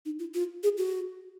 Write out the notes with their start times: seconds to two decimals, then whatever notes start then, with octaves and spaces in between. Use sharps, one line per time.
0.05 D#4
0.19 F4
0.34 F4
0.63 G#4
0.78 F#4